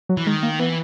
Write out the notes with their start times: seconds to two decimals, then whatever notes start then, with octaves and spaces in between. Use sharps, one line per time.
0.09 F#3
0.17 E3
0.27 D#3 G#3
0.43 A#3
0.59 E3 B3